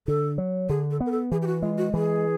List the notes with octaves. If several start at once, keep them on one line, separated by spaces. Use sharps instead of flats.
D3 A4
F#3
D3 G#4
A4
B3
A#4
A4
E3 G#4
G4
F#4
G#3 F4
F#4
E3 G#4